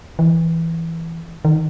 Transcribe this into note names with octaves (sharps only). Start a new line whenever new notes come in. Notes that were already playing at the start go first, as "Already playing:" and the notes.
E3
D#3